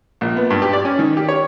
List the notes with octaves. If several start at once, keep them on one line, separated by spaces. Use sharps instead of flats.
A#1
B3
G2
G4
D5
C#4
D#3
G4
C#5